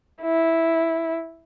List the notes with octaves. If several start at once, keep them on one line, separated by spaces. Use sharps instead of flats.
E4